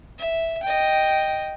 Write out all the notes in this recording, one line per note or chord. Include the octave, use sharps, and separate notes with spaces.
E5
D#5 G5